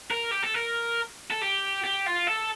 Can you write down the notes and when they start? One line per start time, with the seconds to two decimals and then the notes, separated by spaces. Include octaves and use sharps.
0.11 A#4
0.32 G4
0.43 A4
0.55 A#4
1.30 A4
1.41 G4
1.84 G4
2.06 F4
2.27 A4